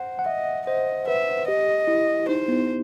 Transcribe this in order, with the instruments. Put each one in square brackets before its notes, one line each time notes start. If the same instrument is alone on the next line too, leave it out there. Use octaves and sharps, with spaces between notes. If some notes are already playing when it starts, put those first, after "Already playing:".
Already playing: [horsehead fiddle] C5 [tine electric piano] F#5
[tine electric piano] F#5
[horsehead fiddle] D#5 [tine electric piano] E5
[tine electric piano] C5 [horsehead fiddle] D#5
[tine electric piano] B4 [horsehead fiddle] E5
[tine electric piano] G4 [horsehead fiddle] D#5
[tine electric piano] E4
[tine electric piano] D#4 [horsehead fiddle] C5
[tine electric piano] B3